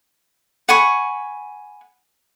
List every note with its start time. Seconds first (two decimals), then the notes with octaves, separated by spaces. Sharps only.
0.69 F#5 G#5 B5 C#6